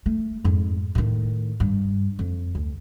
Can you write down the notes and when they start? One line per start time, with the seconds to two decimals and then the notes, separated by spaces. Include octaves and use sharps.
0.06 A3
0.44 F2 G#2
0.95 A2 D#3
1.60 G2
2.19 F2
2.55 D2